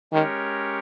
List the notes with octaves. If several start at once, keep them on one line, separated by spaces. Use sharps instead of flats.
D#3 G#3 C#4 G4 A#4 C#5